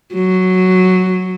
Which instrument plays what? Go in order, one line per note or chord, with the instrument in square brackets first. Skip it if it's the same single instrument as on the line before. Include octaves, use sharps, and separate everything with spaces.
[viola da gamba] F#3